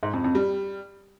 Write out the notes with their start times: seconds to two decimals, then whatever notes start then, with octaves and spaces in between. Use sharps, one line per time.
0.03 G#2
0.13 F2
0.24 F2
0.35 G3